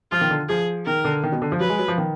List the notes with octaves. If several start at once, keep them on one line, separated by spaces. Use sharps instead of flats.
F3 F4
D#3
D3
F3 G#4
D#3 A#4
D3
D#3
B2
D3
F3
F#3 B4
G#3
F#3
F3
D#3